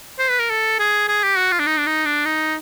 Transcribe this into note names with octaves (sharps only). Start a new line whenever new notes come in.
C5
B4
A#4
A4
G#4
G#4
G4
F#4
F4
D4
D#4
D4
D#4
D4
D#4